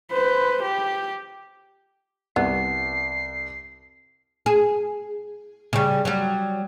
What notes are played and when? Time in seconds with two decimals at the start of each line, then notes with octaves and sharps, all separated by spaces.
0.11 B4 C5
0.62 G4
2.36 C2 B3 C7
4.46 G#4
5.73 C#3 G3
6.05 F#3 G3